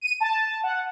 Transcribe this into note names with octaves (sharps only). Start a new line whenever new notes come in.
D#7
A5
F#5